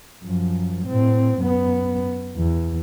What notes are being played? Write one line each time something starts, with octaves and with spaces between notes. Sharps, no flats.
F#2 F3
A2 C4
F#2 B3
E2